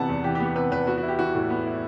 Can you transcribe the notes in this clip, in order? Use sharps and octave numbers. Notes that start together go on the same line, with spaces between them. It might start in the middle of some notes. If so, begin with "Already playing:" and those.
Already playing: C3 E3 B3 F#5 A5
E2
E3 G4
G4
B3
G4
C3 B4
E2 B4
B3 F#4
F#4
E4
G4
E3 F#4
A2
B3
E4